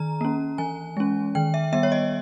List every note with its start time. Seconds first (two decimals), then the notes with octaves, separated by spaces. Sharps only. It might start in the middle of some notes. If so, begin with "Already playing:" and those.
Already playing: D#3 A#5
0.21 A#3 C#4
0.58 E3 G#5
0.97 G#3 C#4
1.35 D#3 G5
1.54 E5
1.72 G3 B3 E5
1.83 C#5
1.92 D#5